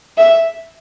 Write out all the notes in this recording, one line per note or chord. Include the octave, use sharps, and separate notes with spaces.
E5